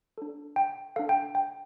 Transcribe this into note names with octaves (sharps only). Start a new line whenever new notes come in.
D4 A4
G5
D4 A4 F5
G5
G5